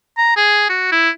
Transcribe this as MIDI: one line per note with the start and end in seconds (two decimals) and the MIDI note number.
0.18 0.32 82
0.36 0.68 68
0.69 0.89 66
0.92 1.10 64